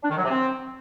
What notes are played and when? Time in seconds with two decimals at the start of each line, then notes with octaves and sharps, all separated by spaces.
0.03 D4
0.10 D#3
0.17 F#3
0.24 C3
0.30 C4